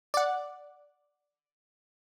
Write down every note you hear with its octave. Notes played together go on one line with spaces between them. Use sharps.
D5 F#5